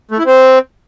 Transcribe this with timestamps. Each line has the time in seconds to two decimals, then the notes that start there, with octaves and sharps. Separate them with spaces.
0.11 A3
0.19 E4
0.26 C4